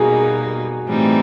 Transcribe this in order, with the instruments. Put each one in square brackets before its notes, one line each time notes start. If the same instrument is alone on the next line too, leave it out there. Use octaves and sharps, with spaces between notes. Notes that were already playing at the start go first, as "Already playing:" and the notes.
Already playing: [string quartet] B2 G3 A#3 D#4 [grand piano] F#4 G#4
[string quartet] A2 E3 G3 C4 D#4